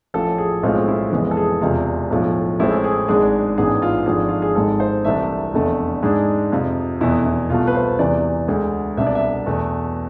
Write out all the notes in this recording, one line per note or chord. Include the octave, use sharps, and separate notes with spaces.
A1 A2 F3 A4
G#4
B1 A2 G#3 C4 F4
E4
F1 F2 E3 G#3 B3
A4
G#4
E1 E2 C3 F4
B1 A2 F3
A1 A2 G#3 C4 E4
G#4
G#1 G#2 G#3 D4 G#4
A1 G#2 E3 B3 D4 G#4
F4
G#1 G#2 F3 A3 D4 G#4
F4
G#4
G#1 G#2 G#3 A4
C5
C2 C3 E3 A3 D4 E5
F1 E2 D3 A3
G#2 G#3 D4 G#4
F2 C3 F3
F1 E2 B2 E4
E4
C2 B2 A3 F4
B4
C5
E1 E2 C3 E3 D5
D2 D3 G#3
C2 B2 B3 D4 E5
D5
E5
E2 B2 A3